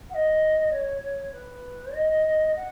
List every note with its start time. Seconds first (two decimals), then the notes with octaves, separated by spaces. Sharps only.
0.10 F#5
0.14 D#5
0.71 C#5
1.02 C#5
1.32 B4
1.94 D#5
2.55 F#5